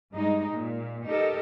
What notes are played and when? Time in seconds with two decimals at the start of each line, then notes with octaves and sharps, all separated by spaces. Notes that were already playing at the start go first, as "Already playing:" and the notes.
0.13 G2 G#3 D#4
0.53 A#2
1.07 D#4 G4 A4 A#4 D#5